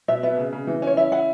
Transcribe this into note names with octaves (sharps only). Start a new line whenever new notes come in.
B2 E5
B3 E5
C#3
C#3
E3
C#4 C#5
E4 E5
E4 F#5